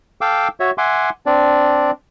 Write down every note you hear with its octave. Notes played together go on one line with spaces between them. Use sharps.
A4 F5 G5 D6 E6
F#4 C#5 E5
E5 F#5 G#5 C6 D6
C4 D4 D5